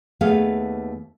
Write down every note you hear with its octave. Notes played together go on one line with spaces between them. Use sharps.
D#2 A3 B3 G#4 F5